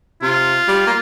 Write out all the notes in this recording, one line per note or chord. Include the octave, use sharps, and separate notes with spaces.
C3 F4
G3
A#3